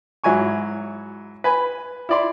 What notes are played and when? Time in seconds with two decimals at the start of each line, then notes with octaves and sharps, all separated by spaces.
0.24 G#2 F#3 E4 G#5 C#6
1.44 B4 G#5 B5
2.09 E4 D5 C6